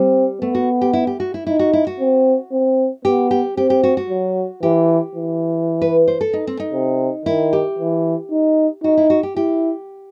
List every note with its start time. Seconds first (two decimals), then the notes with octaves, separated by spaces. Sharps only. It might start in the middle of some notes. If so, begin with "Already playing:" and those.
Already playing: G3 C4
0.41 A3 B3
0.55 F#4
0.81 G4
0.93 E4
1.07 G4
1.20 F#4
1.34 E4
1.47 D#4 E4
1.59 F#4
1.73 E4
1.87 F#4
2.00 C4
2.52 C4
3.05 B3 G4
3.31 G4
3.57 C4 G4
3.70 G4
3.84 F#4
3.97 F#4
4.10 F#3
4.63 E3 G4
5.15 E3
5.82 B4
6.08 C5
6.21 A4
6.33 D#4
6.47 C4
6.60 D#4
6.73 C3
7.26 D#3 E4
7.53 G4
7.79 E3
8.31 D#4
8.84 D#4 F#4
8.97 E4
9.10 F#4
9.23 G4
9.36 E4 G4